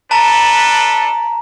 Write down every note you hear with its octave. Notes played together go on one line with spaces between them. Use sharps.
D4 A4 B4 A5 A#5